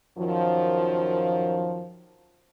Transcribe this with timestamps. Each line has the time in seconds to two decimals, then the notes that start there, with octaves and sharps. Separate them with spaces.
0.18 F#2 D#3 F3